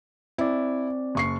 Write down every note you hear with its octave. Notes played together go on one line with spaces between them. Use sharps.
C4 E4 D5
F#1 C#6 C7